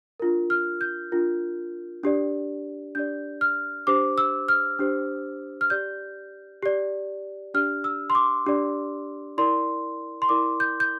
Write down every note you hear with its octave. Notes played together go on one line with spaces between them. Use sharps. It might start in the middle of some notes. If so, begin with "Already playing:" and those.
D4 F4 A#4
F6
G6
D4 F4 A#4
D4 G4 D5
D4 G4 D5 G6
F6
D4 G4 C5 D6
E6
F6
D4 G4 C5
F6
G4 D5 G6
G4 D5
D4 G4 D5 F6
E6
C6
D6
D4 G4 D5
E4 A#4 D5 C6
C6
E4 A#4 D5 D6
G6
G6